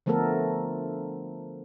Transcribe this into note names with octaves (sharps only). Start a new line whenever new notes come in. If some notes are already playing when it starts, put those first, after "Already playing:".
D3 F3 A3 B3 A4 A#4